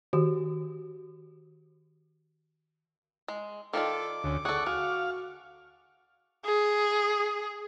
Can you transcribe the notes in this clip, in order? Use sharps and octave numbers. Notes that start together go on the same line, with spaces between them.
D#3 F#4 G4
G#3
D#3 F4 A4 D5 D6
D2 C#4
G#4 A4 D5 F#5 C#6
F#4 G#4 F5
G#4